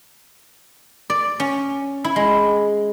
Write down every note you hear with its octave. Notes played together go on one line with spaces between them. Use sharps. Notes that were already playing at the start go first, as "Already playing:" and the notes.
D5
C#4
E4
G#3